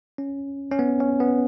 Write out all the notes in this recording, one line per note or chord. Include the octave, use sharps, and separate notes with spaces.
C#4
C#4
B3
C#4
B3